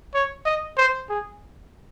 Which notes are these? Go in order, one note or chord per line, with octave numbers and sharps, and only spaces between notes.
C#5
D#5
C5
G#4